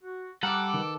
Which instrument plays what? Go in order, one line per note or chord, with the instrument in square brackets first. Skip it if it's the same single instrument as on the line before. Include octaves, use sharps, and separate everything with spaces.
[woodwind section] F#4
[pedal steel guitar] G3 F#5 [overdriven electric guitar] A4 [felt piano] A#5 F6 F#6 [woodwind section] D6
[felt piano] D#3 B4